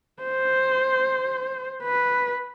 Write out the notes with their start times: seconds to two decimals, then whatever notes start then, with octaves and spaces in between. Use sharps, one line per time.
0.22 C5
1.83 B4